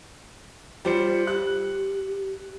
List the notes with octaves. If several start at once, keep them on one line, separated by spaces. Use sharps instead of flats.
G3 F4 C5 C#7
G4 F#6